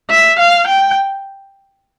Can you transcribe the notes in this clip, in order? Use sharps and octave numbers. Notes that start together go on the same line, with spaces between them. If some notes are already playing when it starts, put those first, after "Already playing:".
E5
F5
G5